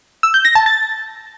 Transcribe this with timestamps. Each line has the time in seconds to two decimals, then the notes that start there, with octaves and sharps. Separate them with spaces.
0.23 E6
0.34 G6
0.45 A#6
0.55 A5
0.66 A6